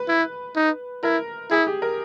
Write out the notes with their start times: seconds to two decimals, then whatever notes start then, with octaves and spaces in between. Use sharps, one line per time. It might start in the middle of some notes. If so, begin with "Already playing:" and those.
Already playing: B4
0.09 E4
0.56 D#4
1.03 E4 A#4
1.51 E4 G#4
1.67 G4
1.82 A#4